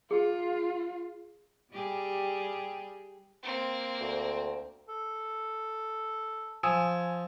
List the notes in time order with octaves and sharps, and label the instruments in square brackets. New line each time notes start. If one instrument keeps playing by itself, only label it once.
[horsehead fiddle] F4 [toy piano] G#4
[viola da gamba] G3 G4 G#4
[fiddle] A#3 C4
[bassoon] D2
[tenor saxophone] A4
[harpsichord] F3 [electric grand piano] G#5 D#6 E6